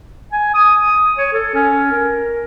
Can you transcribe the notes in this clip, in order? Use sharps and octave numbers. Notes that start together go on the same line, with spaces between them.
G#5
D#6
C#5
A4
C#4
A#4